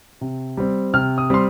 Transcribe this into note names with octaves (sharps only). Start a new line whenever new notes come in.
C3
G3 C4
C3 F6
D#6
G3 C4 C6